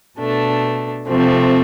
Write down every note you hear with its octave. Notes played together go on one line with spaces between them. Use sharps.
B2 A3 D4
C3 F3 A3 C4